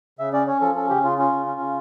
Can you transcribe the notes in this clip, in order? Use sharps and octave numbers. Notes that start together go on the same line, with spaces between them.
C#3 E5
C#4 D5
C#4 C#5
F3 A4
C#4 A4
C#3 G4
C#3 F4
C#4 F4
C#3
C#4
C#3